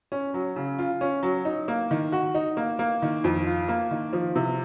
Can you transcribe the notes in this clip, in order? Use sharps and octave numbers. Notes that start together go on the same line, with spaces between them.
C#4
F#3
C#3
F4
C#4
F#3
D#4
A#3
D#3
F#4
D#4
A#3
A#3
D#3
F2
F4
A#3
D#3
F3
C3